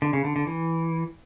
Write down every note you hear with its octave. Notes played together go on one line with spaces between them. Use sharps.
D3
C#3
D3
D3
E3